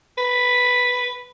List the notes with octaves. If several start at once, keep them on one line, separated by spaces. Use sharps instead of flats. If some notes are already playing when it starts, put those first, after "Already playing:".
B4